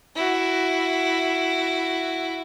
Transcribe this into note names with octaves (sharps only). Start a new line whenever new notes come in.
E4 F#4